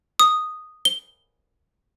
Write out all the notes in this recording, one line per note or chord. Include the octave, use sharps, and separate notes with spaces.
D#6
G7